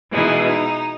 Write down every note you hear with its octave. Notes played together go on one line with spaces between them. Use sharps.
B2 E3 G#3 D#4
D#4